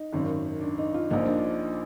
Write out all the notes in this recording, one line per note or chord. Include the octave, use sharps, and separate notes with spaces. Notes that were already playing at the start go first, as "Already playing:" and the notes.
Already playing: D#4
G#1 F#2 D#3
D4
D#4
F4
A#1 A#2 F3 D#4
D4